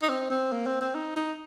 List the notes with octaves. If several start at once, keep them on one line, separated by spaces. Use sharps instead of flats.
D#4
C4
C4
A#3
C4
C4
D#4
D#4